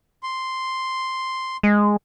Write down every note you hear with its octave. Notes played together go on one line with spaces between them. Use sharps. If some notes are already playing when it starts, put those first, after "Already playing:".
C6
G#3